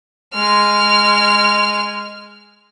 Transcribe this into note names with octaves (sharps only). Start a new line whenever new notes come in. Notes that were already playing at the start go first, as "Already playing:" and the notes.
G#3 F6